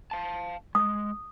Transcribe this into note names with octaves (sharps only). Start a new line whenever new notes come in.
F5 A5
G#3 D#6